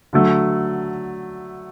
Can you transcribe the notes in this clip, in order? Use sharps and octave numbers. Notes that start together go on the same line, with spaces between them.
D3 F#3 A3